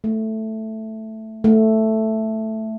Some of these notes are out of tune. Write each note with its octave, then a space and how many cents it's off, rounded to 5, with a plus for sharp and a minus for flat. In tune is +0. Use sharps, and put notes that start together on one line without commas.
A3 +0
A3 +0